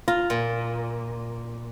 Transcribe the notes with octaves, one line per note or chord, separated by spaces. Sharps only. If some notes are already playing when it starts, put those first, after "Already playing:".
F4 A#5
A#2